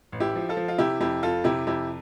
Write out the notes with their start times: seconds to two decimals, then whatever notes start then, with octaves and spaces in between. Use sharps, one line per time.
0.12 A1
0.20 E4 G4
0.36 F3
0.49 F4 A4
0.57 F3
0.68 F4
0.78 C3 E4 G4
1.00 F2 E4 G4
1.23 F2 F4 A4
1.44 C3 E4 G4
1.66 F2 E4 G4